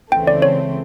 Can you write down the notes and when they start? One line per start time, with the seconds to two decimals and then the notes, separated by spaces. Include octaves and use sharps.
0.11 C#2 C#3 E3 A3 C4 G5
0.27 D5
0.42 C#5